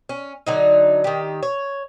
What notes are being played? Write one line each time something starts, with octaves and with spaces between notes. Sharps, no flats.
C#4
D3 F#3 D#4
D#3 G4
C#5